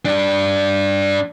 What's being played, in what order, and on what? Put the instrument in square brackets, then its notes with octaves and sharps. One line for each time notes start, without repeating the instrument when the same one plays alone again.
[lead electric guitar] G2 D4